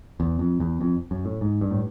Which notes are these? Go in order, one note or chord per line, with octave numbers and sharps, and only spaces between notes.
E2
F2
E2
F2
F#2
A2
G#2
G2
A2